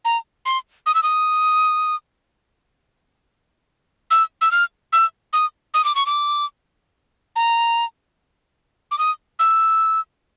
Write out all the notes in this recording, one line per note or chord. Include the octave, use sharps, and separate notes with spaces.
A#5
C6
D#6
E6
D#6
E6
E6
F6
E6
D#6
D#6
D6
C#6
D6
A#5
D6
D#6
E6